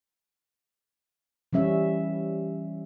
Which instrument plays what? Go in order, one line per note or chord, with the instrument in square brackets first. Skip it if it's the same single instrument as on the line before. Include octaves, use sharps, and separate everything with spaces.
[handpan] E3 G3 C#4 E5